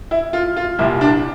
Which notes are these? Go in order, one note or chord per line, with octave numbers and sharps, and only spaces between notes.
E4
F4
F4
C2 A#2 G3 E4
D4